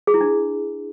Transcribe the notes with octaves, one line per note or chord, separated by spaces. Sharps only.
G#4
E4
D4